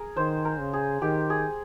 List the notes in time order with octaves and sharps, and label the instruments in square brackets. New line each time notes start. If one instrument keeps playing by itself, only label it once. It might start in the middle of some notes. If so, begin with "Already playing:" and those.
Already playing: [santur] G#4 A#4
[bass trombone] D#3 [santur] C5
[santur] A#4
[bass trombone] C#3
[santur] G#4
[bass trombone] D#3 [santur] G4
[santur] G#4